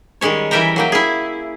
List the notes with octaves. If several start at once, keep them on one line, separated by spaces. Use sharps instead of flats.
D#3 G3 G#3 C#4 C#5
E3 G3 A#4 E5 G5 A#5
F#3 A#3 G5
E4 G#4